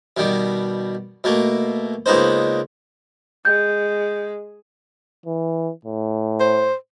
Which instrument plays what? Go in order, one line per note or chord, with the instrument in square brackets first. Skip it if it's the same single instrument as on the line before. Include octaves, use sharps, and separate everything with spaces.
[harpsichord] B2 D#3 G3
B2 A3 A#3
C#2 A#3 B3 D#4 C5
[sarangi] G#3 [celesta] G6
[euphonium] E3
A2
[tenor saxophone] C5